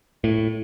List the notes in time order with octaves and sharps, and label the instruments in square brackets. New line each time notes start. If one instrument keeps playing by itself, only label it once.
[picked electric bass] A2